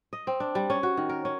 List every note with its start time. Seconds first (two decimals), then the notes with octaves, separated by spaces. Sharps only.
0.13 D#5
0.27 C4
0.40 D4
0.55 G3
0.70 C#4
0.83 F#4
0.97 D#3
1.09 A#4
1.25 C#4